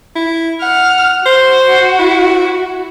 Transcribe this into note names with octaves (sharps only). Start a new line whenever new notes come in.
E4
F#5 F6
F#4 C5
E4